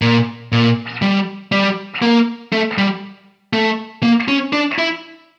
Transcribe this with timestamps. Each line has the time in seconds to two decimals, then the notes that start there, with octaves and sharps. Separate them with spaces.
0.02 A#2
0.52 A#2
1.02 G3
1.52 G3
2.02 A#3
2.53 A3
2.78 G3
3.53 A3
4.03 A#3
4.28 C#4
4.53 D4
4.78 E4